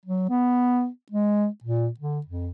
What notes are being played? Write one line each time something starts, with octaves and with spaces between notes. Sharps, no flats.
F#3
B3
G#3
A#2
D3
F2